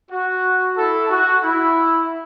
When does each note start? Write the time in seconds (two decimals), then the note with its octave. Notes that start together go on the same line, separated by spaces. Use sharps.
0.10 F#4
0.76 E4 A4
1.10 F#4
1.44 E4